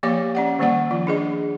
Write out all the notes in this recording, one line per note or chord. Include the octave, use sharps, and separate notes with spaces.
F3 A#3 G4 C#5 F5 D6
C#4 D5 F#5
D#3 G3 A#3 D5 F#5
F3 F4
D4 G#4 D#5